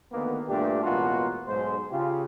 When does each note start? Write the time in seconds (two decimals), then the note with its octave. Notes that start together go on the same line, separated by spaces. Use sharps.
0.12 D2 D#3 A#3 B3
0.48 G2 A#2 A3 D4 G4
0.84 A1 B2 G#3 A#3 F4 F#4
1.47 B1 G#2 G#3 C5
1.91 C#3 F4 G4